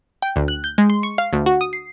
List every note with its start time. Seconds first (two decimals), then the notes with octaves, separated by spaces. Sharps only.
0.22 G5
0.36 D2
0.48 F#6
0.64 G6
0.78 G#3
0.90 C6
1.03 C#6
1.18 F5
1.33 D2
1.46 F#4
1.61 D#6
1.73 C7